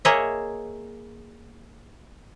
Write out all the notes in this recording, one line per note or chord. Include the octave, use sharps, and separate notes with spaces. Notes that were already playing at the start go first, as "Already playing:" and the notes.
A#3 G#4 C#5 D#5 E5